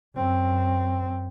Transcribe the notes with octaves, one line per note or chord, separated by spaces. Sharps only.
F#2 C4